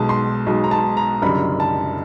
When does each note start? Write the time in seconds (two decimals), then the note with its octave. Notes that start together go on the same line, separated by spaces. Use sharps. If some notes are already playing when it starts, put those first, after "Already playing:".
Already playing: B1 B2 G#3 A5
0.09 C6
0.46 B1 B2 G#3
0.64 A#5
0.71 A5
0.97 A#5
1.22 F#1 F#2 D3 G3 B5
1.60 A5